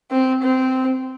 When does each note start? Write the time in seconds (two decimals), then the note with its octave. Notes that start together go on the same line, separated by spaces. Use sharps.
0.11 C4
0.42 C4